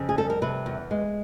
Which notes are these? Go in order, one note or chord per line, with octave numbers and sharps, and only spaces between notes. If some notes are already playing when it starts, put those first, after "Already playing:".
Already playing: F2 C#3
G#4
G3 A4
A#4
C3 B4
E2
G#3